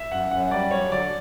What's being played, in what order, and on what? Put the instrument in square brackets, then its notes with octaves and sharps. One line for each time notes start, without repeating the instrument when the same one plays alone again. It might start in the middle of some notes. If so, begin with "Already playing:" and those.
Already playing: [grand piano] E5
[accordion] F#2 [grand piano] F#5
[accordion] F#2 [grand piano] F#5
[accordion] G3 [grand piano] D5
[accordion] F#2 [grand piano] C#5
[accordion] D3 [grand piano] D5